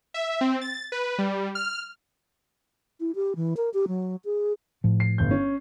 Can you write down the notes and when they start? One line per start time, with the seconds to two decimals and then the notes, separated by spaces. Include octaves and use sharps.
0.14 E5
0.41 C4
0.61 A6
0.92 B4
1.18 G3
1.55 F6
2.99 E4
3.15 G4
3.36 E3
3.57 A#4
3.74 G4
3.88 F#3
4.25 G#4
4.84 A2 F3
5.00 C7
5.18 G1 G6
5.31 C#4